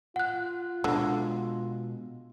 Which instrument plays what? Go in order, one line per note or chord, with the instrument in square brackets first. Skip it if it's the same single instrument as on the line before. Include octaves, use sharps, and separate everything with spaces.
[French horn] F4 [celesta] F#5 F#6
[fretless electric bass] B2 G#3 [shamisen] D3